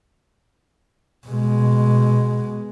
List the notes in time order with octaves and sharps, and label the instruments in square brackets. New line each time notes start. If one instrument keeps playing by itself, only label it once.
[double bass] B2 G#3